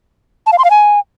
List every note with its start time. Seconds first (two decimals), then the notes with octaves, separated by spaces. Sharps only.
0.47 A5
0.53 F5
0.59 C6
0.64 F5
0.70 G#5